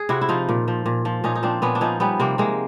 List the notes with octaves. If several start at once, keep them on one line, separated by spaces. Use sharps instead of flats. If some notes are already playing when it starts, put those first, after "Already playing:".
Already playing: G#4
C3 E4 F#4
E4
F3 D#4 F4
A#2
F3
A#2
F3
A#2 C#4 D#4
D#4
F3 C4 D4
A#2 B3 C#4
D4
F3 C#4 D#4
G3 B3 C#4
C3 A#3 C4
C3 G#3 A#3